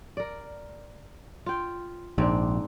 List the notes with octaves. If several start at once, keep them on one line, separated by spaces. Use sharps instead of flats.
A#4 D5
F4 G5
A#1 G#2 C4 D4